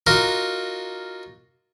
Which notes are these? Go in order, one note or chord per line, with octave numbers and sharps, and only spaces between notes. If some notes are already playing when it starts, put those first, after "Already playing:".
D#4 F4 F#4 A#4 D6